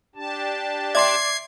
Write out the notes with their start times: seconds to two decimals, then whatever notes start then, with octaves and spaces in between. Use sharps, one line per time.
0.15 D4 G4 A5
0.95 D5 E5 C6 G#6 C7